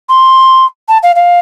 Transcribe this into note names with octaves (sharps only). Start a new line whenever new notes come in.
C6
A5
F5
F5